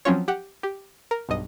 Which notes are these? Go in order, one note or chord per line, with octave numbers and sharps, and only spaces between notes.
F3 F#3 C4 C#4 F4 C#5
G4 F#5
G4
A#4
B1 G2 D#5